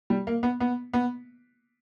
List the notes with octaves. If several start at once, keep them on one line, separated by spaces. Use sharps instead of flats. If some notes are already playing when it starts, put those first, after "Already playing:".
G3
A#3
B3
B3
B3